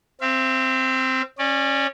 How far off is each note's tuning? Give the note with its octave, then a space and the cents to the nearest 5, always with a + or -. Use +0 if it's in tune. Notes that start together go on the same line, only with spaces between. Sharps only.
C4 +0 E5 +45
C#4 -15 D5 +10